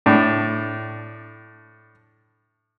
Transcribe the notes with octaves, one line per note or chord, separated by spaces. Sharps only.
A2 D4